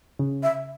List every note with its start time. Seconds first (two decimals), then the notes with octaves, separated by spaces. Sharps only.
0.19 C#3
0.43 E5